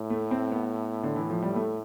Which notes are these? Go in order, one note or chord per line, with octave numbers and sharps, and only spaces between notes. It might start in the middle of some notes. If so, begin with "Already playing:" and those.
Already playing: A2
A3
C4
B3
D3
E3
F3
G3
A3